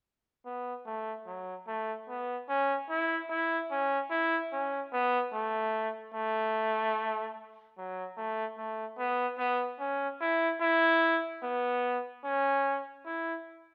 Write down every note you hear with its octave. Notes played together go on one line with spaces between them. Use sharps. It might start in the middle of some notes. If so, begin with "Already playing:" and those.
B3
A3
F#3
A3
B3
C#4
E4
E4
C#4
E4
C#4
B3
A3
A3
F#3
A3
A3
B3
B3
C#4
E4
E4
B3
C#4
E4